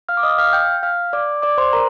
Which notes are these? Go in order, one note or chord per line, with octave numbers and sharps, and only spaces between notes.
F5 F6
D6
D#5 D#6
F5 F6
G5 G6
F5 F6
D5 D6
D5 D6
C5 C6
A#4 A#5